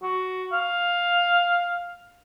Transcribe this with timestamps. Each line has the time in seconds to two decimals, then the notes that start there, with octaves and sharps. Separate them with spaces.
0.03 F#4
0.52 F5